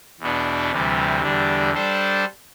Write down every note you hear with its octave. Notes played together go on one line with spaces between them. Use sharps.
E2 B2 B3 D4
D2 C3 E3 G3
E2 D3 G3 D4
G3 D4 A4 C5